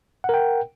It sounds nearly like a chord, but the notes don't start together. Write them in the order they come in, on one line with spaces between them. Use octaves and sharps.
F#5 A#4 G5